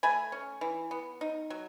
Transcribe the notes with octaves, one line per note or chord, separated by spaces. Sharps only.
A3 G#5 B5
C#4
E3
B3
D#4
F#3